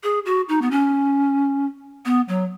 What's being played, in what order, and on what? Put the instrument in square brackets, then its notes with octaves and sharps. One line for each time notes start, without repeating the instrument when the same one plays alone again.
[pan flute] G#4
F#4
D#4
B3
C#4
B3
F#3